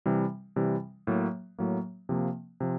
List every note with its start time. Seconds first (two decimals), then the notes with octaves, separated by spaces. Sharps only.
0.06 C3 E3 G3
0.56 C3 E3 G3
1.07 A2 F#3 A#3
1.59 A2 F#3 A#3
2.09 C3 F3 A#3
2.60 C3 F3